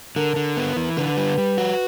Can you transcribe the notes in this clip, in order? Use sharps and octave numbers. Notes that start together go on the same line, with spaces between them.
D3 A#4
D3
B3
E3
D3 B4
G3
G3
F#4